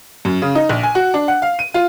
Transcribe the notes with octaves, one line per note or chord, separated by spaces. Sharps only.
F#2
C#3
D#4
A#1
G#5
F#4
D4
F#5
F5
D#7
F4